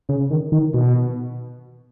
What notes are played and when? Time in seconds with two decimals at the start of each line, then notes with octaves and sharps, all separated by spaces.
0.09 C#3
0.31 D#3
0.52 D#3
0.74 B2